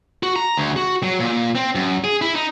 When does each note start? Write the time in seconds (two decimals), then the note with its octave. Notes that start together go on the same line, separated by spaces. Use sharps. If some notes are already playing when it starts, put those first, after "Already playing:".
0.23 F#4
0.36 A#5
0.57 D2
0.76 F#4
1.03 F#3
1.20 A#2
1.55 C4
1.75 F#2
2.04 G#4
2.22 E4
2.35 D#4